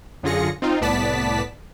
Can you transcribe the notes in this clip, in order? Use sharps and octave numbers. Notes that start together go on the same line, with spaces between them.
F#2 D3 F4 G#4 A#6 C#7
C4 D#4 F4
C2 A2 B3 D5 A5 B6